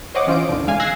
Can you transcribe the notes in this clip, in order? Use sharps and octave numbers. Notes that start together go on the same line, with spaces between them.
C5 C#5 D#5 F#5 D6
E3 C#4 F4 C5 D7
D#2 B2 D3
G#3 F5 G#5
E6 F#6 G#6 A#6 C7